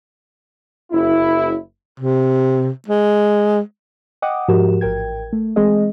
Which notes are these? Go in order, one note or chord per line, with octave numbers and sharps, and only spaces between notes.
F#1 E4
C3
G#3
D#5 F#5 G5 D6 D#6
G#2 F3 F#4 G4 A#4 E7
A1 A#4 G5 G#6
A3
E3 G#3 C4 G#4 D#5